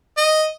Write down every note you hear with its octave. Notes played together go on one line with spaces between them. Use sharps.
D#5